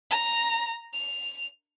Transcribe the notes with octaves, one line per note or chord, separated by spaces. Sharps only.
A#5
F7